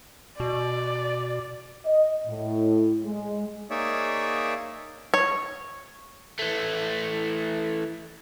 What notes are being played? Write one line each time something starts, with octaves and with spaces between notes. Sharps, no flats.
B2 D5
D#5
A2
G#3
A#3 D#4 G#4 C#5 D5 E5
C#5
E3 A3